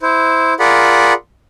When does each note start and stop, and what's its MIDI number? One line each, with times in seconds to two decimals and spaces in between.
0.02 0.54 64
0.02 0.54 72
0.60 1.13 65
0.60 1.13 68
0.60 1.13 70
0.60 1.13 74
0.60 1.13 78
0.60 1.13 83